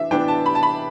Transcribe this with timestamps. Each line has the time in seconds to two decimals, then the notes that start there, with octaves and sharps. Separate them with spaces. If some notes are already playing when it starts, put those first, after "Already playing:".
Already playing: E3 D4 E5
0.11 E3 B3 D4 G5
0.28 A5
0.46 B5
0.55 A5
0.63 B5